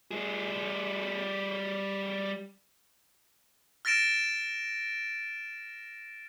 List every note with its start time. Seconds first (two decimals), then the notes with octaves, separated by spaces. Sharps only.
0.11 G3 G#4
3.85 F6 A6 A#6 D7 E7